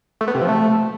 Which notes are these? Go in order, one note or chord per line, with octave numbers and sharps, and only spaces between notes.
A3
B3
C3
F3
A3